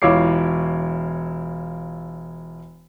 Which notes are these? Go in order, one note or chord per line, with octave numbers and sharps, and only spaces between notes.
E1 E4 F4 C#5 D6 C7